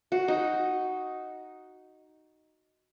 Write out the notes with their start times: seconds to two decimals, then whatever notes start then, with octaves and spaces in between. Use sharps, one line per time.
0.12 F#4
0.28 D#4